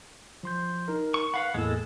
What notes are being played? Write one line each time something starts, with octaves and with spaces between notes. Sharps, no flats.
F3 C6 G6
D#4 A#4
C#6
B4 F5 F#5 B5
E2 A2 G#3 A#3 A4